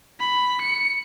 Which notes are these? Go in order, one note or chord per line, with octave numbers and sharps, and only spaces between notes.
B5
C#7